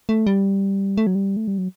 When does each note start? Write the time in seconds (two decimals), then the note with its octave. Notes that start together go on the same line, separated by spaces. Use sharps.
0.09 A3
0.27 G3
0.97 A3
1.07 F#3
1.15 G3
1.37 A3
1.48 G3
1.58 F#3